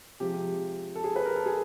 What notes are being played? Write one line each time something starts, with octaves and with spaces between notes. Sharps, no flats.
C3 F3 G#3 G4
A4
G#4
B4
A#4
A4
G#4